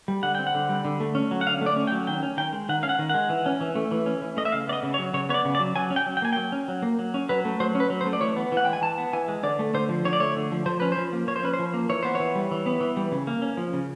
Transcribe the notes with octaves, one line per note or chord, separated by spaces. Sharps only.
G3
D3 F#5
C4 G5
F#5
D3
G3
D3
A3
C#4
F#3
F#5
D3 F5
A3
D5
C#4
G5
F#3
D#3 G5
C#4
D#3 G5
G#3
D#3 F#5
C#4 F5
F#5
D#3
G#3 F#5
E3
C#4
E3
A3
E3
C#4
E3
A3 D#5
E5
C#3 F5
B3 D5 D#5
C#3
C#5
F#3
C#3 C#5
B3 C#5
D5
C#3
D5
F#3
F#3 G#5
C#4
G5
F#3
G5
A#3 G#5
F#3 G5
C#4
F#3
A#3
F#3
C#4
F#3 B4
A3
F#3 C5
C#4
B4
F#3
C5
A3
D5
E3 C#5
B3
E3
F#5
G#3 G5
G#5
E3 A5
B3
E3 G#5
G#3
D3 D5
A3
D3 C5
F3
D3 C#5
D5
A3 C#5
D3
F3
F3 C5
C#4 B4
C5
F3
A#3
F3 C#5
C5
C#4 B4
C5
F3
A#3
E3 C#5
B3 C5
E3 C#5
G3
E3
B3
E3
G3
C#3
A#3
C#4
F3
C#3